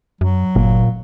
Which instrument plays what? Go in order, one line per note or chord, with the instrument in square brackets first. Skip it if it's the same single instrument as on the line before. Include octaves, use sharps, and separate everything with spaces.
[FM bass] F#2 [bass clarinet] F#3
[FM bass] G1 [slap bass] A#2 A#3